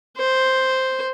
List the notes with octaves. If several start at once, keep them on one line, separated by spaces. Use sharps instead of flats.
C5